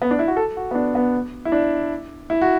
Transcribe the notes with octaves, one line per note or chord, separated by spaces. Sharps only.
B3
D4
E4
F#4
A4
F#4
B3
D4
B3
E4
D4
E4
F#4